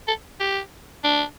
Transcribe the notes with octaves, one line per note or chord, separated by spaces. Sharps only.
A4
G4
D4